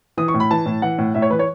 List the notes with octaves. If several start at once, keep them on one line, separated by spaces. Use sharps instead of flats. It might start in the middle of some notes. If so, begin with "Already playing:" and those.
E3 D#6
C#6
A2
B5
E3 A5
A2
E3 F#5
A2
A2 E5
C#5
E3 B4
C#5